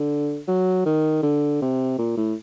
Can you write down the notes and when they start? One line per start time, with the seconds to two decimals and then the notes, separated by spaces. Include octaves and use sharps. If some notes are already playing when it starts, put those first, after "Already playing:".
Already playing: D3
0.48 F#3
0.86 D#3
1.23 D3
1.62 C3
1.99 A#2
2.17 A2